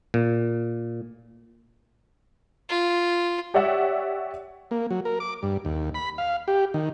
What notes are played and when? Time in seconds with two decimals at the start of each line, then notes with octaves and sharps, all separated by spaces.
0.14 A#2
2.69 F4
3.54 G4 C#5 D5 E5 F#5
4.71 A#3
4.90 F#3
5.05 A#4
5.20 D6
5.43 G2
5.65 D#2
5.94 B5
6.18 F5
6.48 G4
6.74 D#3